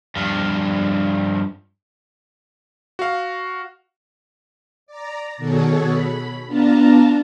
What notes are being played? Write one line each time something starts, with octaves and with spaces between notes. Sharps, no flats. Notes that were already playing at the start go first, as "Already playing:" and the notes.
G2 F3
F#4 F5
D5 A#5
B2 D#3 F#4 G#4 A4 C#5
B5
B3 D4 F4 A5 A#5